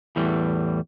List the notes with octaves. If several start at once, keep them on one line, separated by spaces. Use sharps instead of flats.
E2 A2 E3 G3